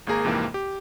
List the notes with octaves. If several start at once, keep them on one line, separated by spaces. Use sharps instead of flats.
G#1 A#3 G#4 A#5
F2 G#2 C3 E3 A#3
G4